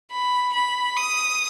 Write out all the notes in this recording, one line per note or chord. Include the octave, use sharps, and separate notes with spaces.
B5
B5
D#6